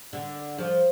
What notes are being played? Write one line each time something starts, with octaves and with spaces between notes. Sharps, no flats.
D3
F3